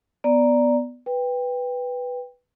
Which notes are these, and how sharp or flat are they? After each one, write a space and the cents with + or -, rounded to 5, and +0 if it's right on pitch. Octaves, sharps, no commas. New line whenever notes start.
B3 +0 D5 +0 A#5 +0
B4 +0 G5 +20